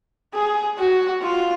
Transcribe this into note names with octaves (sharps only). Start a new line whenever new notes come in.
G#4
F#4
F4